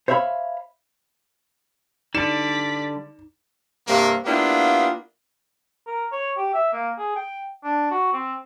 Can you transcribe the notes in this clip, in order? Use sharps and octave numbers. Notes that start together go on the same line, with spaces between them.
C5 C#5 E5 F5 B5
D3 G3 D#4 D5 B6 E7
G2 C3 A#3
A#3 B3 D4 E4 F4 G4
A#4
C#5
G4
E5
A#3
G#4
G5
D4
F#4
C4